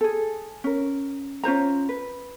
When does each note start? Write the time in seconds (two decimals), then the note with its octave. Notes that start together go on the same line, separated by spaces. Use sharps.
0.01 G#4 A4
0.64 C#4 A#4
1.44 C#4 F4 C5 A#5
1.89 B4